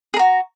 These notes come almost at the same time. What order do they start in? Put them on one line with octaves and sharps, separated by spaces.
G#4 A#5 F#4